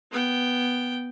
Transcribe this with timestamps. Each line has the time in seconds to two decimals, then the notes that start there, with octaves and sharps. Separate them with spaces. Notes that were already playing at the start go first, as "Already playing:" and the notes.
0.11 B3 G5